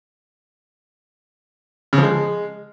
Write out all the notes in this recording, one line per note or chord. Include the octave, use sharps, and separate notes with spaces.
C#3
F3
G#3